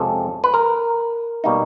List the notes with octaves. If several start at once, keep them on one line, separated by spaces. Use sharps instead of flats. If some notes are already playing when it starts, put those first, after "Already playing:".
Already playing: F2 C3 F3 G#3 C#4 A4
B4
A#4
B2 G3 A#3 D#4